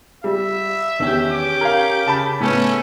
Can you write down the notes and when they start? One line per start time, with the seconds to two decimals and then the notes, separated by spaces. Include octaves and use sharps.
0.24 G3 E5
0.99 E2 D#3 C#4 G4 E6
1.31 D6
1.61 A#4 F5 G#6
2.06 C#3 A5 B5
2.41 A2 A3 B3 C#4